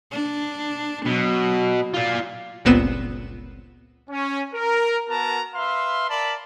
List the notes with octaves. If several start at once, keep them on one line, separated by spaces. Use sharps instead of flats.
D4
B2 F#3
F4 D5
G1 C#2 A#2 B3 C4 E7
C#4
A#4
B3 F#4 A#4 A5 A#5
B4 E5 F5 C6
A#4 D5 A5 B5